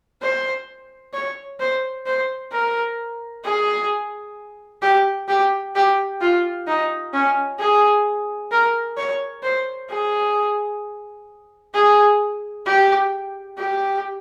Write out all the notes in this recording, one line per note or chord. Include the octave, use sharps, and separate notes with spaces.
C5
C#5
C5
C5
A#4
G#4
G4
G4
G4
F4
D#4
C#4
G#4
A#4
C#5
C5
G#4
G#4
G4
G4